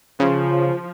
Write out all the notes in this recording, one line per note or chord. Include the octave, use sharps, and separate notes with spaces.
C#3 F3